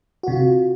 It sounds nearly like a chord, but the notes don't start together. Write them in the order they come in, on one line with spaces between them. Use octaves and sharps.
F#4 C3 F4